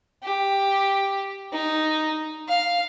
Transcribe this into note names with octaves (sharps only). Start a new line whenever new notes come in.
G4
D#4
F5